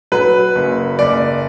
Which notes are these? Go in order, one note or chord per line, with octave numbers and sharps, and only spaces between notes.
F#3 B4
F#1
F#1 D5